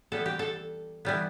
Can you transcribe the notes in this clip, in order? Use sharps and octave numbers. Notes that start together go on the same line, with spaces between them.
E3 G3 B3 A4
G4
A4
E3 G3 B3